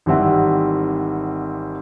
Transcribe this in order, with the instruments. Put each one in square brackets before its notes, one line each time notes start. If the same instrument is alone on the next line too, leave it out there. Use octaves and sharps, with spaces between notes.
[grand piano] G#1 E3 G3 C4 E5 F#5